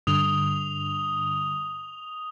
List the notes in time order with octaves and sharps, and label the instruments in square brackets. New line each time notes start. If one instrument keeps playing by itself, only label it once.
[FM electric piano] G2 D3 [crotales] D#6 F7 G7